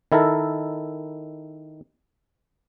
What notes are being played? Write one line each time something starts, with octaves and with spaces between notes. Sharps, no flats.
D#3 E4 A4 A#4